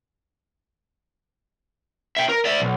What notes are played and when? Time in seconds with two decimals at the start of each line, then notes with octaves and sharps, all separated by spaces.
2.17 E5 G5
2.29 A#4
2.45 D5 E5
2.60 B1